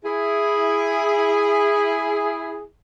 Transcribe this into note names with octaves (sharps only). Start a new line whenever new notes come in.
E4 G#4